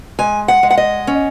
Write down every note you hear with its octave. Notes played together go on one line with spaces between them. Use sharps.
G#3 G#5
F#5
G#3
F#5
D#5
C#4